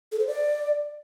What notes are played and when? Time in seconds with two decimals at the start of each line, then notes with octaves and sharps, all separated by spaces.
0.12 A4
0.19 C5
0.27 D5